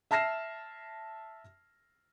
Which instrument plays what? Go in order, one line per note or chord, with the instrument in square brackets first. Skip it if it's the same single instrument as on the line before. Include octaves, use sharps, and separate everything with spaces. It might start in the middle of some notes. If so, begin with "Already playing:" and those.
[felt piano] E5 A5 F6 A#6 C7 E7